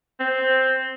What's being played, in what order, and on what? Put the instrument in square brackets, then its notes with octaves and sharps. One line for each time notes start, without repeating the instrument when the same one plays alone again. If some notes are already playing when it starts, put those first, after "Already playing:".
[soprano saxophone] C4